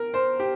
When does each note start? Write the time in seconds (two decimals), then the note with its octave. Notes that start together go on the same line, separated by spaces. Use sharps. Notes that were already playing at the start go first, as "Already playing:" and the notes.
Already playing: A#4
0.14 C5
0.40 G4